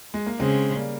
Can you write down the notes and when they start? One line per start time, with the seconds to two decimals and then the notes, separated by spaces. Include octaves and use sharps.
0.14 G#3
0.26 A#3
0.40 C#3 G#3 C4
0.76 G3 A#3